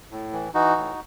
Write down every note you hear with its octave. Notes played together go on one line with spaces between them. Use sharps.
A2
E3
E3 D#4 F#4
A2